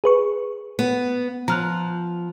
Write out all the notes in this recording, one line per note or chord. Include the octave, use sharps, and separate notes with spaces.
G#4 B4 C#6
B3
F3 A#5 F6 F#6